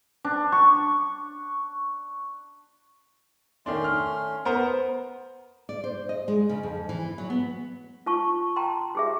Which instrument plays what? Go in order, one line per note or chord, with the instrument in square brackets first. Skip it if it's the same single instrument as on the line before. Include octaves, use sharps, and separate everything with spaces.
[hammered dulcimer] D4
C#6
[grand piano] D#3 D4 [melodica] A3 C#4 C6
[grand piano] F6
B3 A#4 C5
[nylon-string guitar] D5
C5
D#5
G#3
C#3
F2
E3
F#3
B3
[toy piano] F4 A5 C#6
G5 A5 A#5 C6
G4 G#4 E5